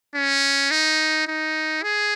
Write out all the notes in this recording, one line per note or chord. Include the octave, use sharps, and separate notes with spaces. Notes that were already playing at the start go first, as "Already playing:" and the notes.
C#4
D#4
D#4
G#4